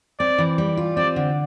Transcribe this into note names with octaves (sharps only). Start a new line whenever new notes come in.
C4 D5
E3
G3
F4
C4 D5
D3